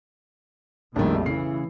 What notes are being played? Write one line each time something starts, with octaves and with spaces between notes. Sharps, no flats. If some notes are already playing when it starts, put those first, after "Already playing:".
A#1 F2 B2 D#3 G3 A3 D4
C#3 E3 C7